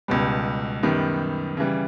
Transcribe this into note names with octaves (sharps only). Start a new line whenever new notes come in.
C#2 B2 G3
F#2 D#3 G3 B3
C#3 E3 G3